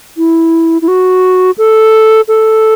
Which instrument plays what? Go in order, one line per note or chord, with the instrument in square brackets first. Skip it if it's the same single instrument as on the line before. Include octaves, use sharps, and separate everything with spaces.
[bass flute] E4
E4
F#4
A4
A4